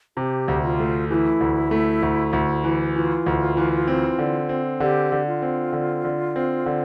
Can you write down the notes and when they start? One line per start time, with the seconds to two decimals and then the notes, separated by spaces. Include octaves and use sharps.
0.17 C3 G4
0.48 D2
0.63 F4
0.80 A3
1.10 E3 E4 G4
1.41 D2
1.71 A3
2.02 D2
2.33 D2
2.64 E3
2.95 E3 F4
3.26 D2
3.57 E3
3.87 C4
4.19 D3
4.49 C4
4.80 D3 G4
5.12 D3
5.27 F4
5.42 C4
5.73 D3
6.04 D3
6.36 C4
6.66 D3